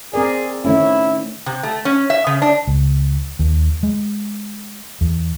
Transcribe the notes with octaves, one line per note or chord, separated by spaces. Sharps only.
C4 G#4 A#4 D5
D#3 A3 C#4 E4
C3
A3
C#4
E5
C#3
D4
C#2
D#2
G#3
E2